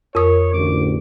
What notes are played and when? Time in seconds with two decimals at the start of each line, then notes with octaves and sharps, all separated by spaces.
0.15 F2 A#4 C#5 D#6
0.53 A1 D2 D6